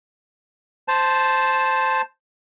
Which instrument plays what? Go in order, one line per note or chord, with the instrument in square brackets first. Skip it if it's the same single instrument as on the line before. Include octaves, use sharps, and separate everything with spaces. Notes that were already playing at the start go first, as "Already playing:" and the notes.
[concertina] C5 A5